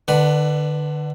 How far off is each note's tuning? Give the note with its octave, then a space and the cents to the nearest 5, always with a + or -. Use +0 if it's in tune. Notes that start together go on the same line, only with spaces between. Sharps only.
D3 +30 D4 +0 B4 +0